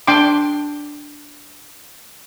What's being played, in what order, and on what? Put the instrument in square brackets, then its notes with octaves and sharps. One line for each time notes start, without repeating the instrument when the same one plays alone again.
[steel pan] D4 G5 C6 D6